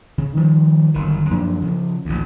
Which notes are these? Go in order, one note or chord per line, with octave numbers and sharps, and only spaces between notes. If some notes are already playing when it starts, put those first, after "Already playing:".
C#3
D#3 F3 G3
G1 F#2 D#3
F#2 A#2 F3 D4
C#3 F3
A1 D2